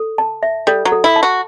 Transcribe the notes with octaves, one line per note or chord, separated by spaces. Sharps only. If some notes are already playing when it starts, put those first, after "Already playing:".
Already playing: A4
A5
E5
G3 A4
F#3
A4
E4
A5
F#4